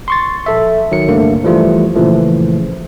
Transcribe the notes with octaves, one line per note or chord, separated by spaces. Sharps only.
C6 C#6 A6
A#1 A4 E5
D#3 F#3 C#7
C2 G2 D3 A3 A#3
E3 F3 G3 A3 F4
A#2 C#3 E3 F3 A3